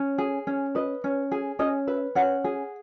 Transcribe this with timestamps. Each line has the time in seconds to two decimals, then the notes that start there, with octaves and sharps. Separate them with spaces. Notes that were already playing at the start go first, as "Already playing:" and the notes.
Already playing: C#4
0.18 G#4
0.47 C#4
0.75 B4 D#5
1.04 C#4
1.32 G#4
1.59 C#4 D#5
1.87 B4 E5
2.15 C#4 F#5
2.44 G#4